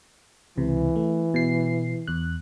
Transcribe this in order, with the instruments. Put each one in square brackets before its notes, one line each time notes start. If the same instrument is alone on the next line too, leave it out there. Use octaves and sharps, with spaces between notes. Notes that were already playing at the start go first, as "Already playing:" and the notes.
[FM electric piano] C#2 C3 [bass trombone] E3
[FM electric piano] A3
B2 C7
E2 F#6